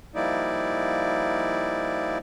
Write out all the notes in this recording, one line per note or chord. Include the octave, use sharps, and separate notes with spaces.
F3 G3 A#3 D#4 E4 D5